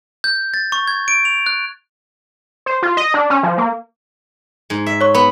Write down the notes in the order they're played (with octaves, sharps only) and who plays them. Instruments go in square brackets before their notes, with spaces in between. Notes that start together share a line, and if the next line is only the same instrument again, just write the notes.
[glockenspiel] G6
A6
C#6
G#6
D7
F7
F#6
[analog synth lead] C5
F4
D#5
D4
C#4
F3
A#3
[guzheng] G#2
E5
[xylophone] C#5 C#6
[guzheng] B3 [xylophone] B5